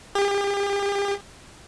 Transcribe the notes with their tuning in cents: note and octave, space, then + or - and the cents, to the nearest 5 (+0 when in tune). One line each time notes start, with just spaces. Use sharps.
G4 +40